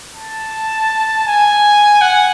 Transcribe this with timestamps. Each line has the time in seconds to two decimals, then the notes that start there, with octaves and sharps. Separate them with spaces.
0.15 A5
1.27 G#5
2.01 F#5